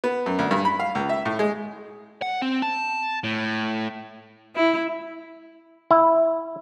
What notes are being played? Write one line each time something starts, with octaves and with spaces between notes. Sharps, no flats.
B3
F#2
D2
G2
B5
F5
C#2
E5
A2
G#3
F#5
C4
A5
A2
E4
E4